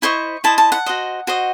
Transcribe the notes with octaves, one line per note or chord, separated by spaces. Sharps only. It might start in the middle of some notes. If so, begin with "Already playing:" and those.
E4 C5 D#5 C#6
E4 C5 D#5 A5
A5
F#5
F#4 C5 D#5
F#4 C5 D#5